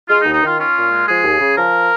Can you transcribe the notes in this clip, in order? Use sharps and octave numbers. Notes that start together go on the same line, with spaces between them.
G#3 F4
D#4
D#2
D#4
D#3 F4
C#4 F4
A#2
G#3
F3 G#4
D#2
C#3
F3 A#4